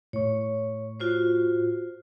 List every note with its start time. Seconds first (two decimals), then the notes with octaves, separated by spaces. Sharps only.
0.13 A2 C#5 C#6
1.00 F4 F#4 C5